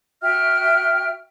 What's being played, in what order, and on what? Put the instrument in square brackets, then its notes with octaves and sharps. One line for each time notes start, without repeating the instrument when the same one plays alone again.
[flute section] F#4 E5 G5 F6